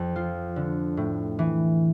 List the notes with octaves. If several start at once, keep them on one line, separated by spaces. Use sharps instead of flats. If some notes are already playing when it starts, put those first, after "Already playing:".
Already playing: F2
F3 F4
D3
A2
E3